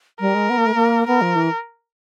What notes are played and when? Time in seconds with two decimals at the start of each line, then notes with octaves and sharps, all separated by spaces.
0.20 G3 A#4
0.35 G#3
0.50 B3
0.58 A#3
0.66 A3
0.75 A#3
1.07 B3 A#4
1.22 F3
1.36 E3